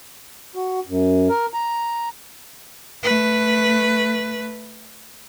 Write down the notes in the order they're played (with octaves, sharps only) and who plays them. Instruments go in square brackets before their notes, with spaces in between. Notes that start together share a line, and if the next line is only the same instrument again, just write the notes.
[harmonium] F#4
F#2
A#4
A#5
[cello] A3 B4